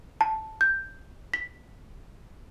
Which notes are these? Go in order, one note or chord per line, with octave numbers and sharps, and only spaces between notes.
A5
G6
B6